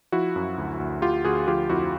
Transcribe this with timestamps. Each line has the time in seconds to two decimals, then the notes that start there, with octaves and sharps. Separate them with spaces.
0.12 F3 E4 F#4
0.36 F#2
0.58 D2
0.80 D2
1.02 D2 F4 G4
1.25 D2 F#4 G#4
1.47 F3 F4 G4
1.70 F2 E4 F#4